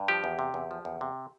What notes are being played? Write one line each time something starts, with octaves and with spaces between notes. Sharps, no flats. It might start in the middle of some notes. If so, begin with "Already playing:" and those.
Already playing: G2
F3 G4
E2
C3
E2
F3
E2
C3